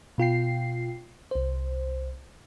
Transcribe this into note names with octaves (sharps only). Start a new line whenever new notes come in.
B2 F4 G5 C7
C2 C5